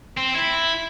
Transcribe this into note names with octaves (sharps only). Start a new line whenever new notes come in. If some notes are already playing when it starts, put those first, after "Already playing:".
C4
E4